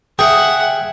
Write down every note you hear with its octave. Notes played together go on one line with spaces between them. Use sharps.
G#4 E5 F#5 G5